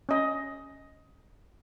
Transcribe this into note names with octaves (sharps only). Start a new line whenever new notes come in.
C#4 D#5